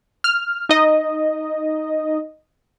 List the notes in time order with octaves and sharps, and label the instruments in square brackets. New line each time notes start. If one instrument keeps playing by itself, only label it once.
[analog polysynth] F6
D#4 D#5